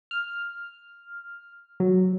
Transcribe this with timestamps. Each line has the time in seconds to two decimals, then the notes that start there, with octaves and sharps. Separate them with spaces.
0.11 F6
1.80 F#3